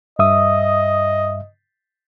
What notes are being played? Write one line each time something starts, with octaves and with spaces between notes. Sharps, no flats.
G2 D#5 E5 D#6